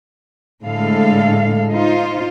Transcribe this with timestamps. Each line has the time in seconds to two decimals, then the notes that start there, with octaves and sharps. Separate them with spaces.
0.63 A2 D3 G#3 A4 F5
1.72 D#4 F4 C5